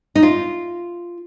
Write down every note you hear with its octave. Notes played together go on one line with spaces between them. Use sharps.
D#4
F4